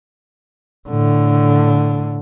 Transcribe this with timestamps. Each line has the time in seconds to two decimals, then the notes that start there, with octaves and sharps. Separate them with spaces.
0.89 A2 D3